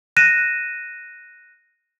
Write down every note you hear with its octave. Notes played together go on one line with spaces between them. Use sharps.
F#6 A#6 D#7 E7